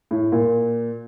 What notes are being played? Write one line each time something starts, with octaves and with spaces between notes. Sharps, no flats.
A2
A#2